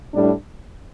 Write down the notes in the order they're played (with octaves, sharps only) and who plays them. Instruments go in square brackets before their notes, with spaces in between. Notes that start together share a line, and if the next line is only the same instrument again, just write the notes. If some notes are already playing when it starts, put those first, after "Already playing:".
[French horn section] A2 G3 D4